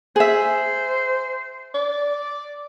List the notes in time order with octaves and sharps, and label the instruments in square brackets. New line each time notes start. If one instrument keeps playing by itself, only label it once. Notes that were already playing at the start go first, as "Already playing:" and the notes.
[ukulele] G#4 E5 [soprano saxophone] C5
[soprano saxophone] D5